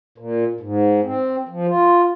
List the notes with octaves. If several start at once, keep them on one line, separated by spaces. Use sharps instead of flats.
A#2
G#2
C4
F3
F4